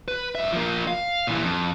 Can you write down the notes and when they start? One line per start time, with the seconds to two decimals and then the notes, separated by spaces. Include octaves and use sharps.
0.08 B4
0.35 G2 E5
0.52 F3 A#3
0.87 F5
1.27 A#2 E3
1.42 F2